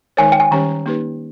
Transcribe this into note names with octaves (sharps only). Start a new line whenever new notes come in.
D#3 G#3 D#4 A#4 C#5 G#5
G5
G#5
D#3 G3 C#4 G4 C#5 A#5
A#3 D#4 G4 B4